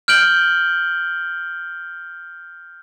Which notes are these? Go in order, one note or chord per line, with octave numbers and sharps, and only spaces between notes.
F6 G6 D7 F#7 G7